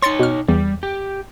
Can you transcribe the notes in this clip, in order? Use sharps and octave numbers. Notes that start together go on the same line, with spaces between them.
D#4 C#5 C6 A6 C#7
B2 F6
E2 G3
G4